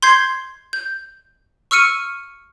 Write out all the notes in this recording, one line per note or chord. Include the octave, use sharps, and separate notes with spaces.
C6 G6 G#6 C7
G6
C#6 E6 F6 C#7 D#7